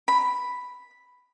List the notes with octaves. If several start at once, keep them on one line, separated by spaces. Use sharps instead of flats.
B5